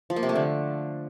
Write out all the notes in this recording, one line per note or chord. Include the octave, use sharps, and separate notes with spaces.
F3
A#3
C3
A3
D3